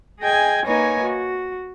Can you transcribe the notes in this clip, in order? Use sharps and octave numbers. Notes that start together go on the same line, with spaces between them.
G#4 D#5 G5 G#5 G#6
A#3 D#4 B4 C#5 D#5 G#5
F#4